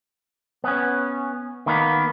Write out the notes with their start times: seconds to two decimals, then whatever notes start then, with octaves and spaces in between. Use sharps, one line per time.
0.64 B3 C#4
1.66 D#3 A#3 B3